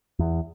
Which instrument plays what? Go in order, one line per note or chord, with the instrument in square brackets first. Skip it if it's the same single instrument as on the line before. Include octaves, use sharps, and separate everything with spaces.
[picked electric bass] E2